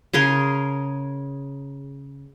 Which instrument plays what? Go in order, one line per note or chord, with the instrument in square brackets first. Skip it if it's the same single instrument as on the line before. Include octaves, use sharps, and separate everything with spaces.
[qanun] C#3 G#4 A#4 C6